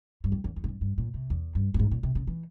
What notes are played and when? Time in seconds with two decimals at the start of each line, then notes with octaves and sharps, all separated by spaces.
0.24 G2
0.32 F2
0.44 E2
0.56 F2
0.64 G#2
0.69 G2
0.81 G2
0.98 A#2
1.14 C3
1.30 E2
1.55 G2
1.74 G2
1.79 G#2
1.91 A#2
2.03 C3
2.15 C#3
2.27 E3